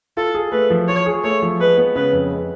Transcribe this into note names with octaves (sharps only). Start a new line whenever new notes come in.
F4 A4
G#4
A3 B4
F3
F4 C#5
G#4
A3 C#5
F3
G#3 B4
B3
C#3 B4
F2
G#3